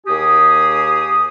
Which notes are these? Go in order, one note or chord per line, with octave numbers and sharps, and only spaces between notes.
D#2 G4 G#4 D#6